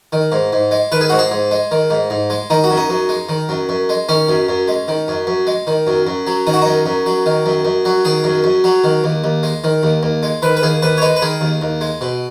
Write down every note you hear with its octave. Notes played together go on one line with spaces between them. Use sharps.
D#3
G#2
G#2
G#3
D#3 B4
G#4
G#2 F#4
G#4
G#2
G#3
D#3
G#2
G#2
G#3
D#3 D#4
F#4
F#2
D#4
F#2
G#3
D#3
F#2
F#2
G#3
D#3 C#4
F#2
F#2
G#3
D#3
F#2
F#2
G#3
D#3
F#2
F#2
F#3
D#3 D#4
F#4
F#2 D#4
F#2
F#3
D#3
F#2
F#2
F#3
D#3 G#4
F#2
F#2
F#3
D#3
D#2
D#2
G#3
D#3
D#2
D#2
G#3
D#3 B4
B4
D#2 G#4
D#2 B4
C#5
G#3 B4
B4
D#3 G#4
D#2
D#2
G#3
B2